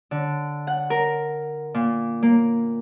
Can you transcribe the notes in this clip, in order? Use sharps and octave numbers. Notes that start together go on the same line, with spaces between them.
D3
F#5
A#4
A#2
A#3